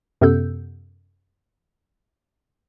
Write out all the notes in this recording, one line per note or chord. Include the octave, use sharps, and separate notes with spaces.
F#2 C3 B3 A4 E6 G6